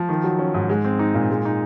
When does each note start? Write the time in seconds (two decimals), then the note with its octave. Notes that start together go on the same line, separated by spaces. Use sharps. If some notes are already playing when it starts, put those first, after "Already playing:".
Already playing: F3
0.09 D#3
0.24 F#3
0.39 C#4
0.54 G#2
0.69 G#3
0.84 C4
0.99 D#4
1.14 A#2
1.30 G#3
1.45 D#4